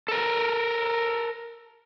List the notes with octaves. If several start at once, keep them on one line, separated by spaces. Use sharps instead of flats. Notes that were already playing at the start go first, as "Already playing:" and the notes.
A4 A#4